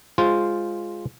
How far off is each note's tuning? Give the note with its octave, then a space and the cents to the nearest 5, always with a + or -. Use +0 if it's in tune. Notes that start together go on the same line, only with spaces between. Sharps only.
G#3 +0 F4 +0 C5 +0